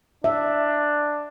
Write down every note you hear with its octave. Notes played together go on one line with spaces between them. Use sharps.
D4 E5